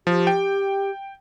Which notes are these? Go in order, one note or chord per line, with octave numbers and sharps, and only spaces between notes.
F3 G4
G5